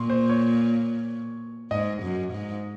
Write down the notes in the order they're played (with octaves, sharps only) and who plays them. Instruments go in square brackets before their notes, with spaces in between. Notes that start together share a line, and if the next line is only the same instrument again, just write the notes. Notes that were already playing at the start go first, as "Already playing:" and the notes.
Already playing: [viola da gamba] A#2 [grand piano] C6 C#6
[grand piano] C5
C#5
[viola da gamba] G#2 [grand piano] D#5
[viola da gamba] F#2
G#2